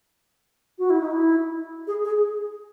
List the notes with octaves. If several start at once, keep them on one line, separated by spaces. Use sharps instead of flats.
F#4
E4
D#4
E4
G#4
G#4